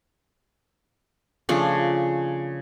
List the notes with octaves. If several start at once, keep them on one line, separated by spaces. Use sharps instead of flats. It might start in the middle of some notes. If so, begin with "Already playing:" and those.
C#3 F3 A3 D4